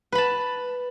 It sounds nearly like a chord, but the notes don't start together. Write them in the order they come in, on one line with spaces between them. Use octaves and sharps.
B4 B5 A5